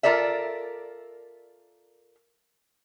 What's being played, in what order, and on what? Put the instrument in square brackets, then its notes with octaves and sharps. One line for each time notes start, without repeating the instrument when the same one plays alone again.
[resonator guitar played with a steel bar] F4 A4 A#4 D5 E5